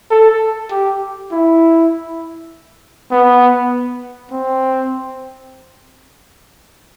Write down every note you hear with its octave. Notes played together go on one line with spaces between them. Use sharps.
A4
G4
E4
B3
C4